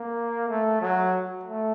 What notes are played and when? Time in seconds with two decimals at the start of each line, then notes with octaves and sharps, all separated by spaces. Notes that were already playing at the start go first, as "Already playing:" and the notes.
Already playing: A#3
0.49 A3
0.81 F#3
1.44 A3